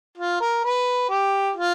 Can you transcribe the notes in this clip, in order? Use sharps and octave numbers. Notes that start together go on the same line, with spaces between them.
F4
A#4
B4
G4
F4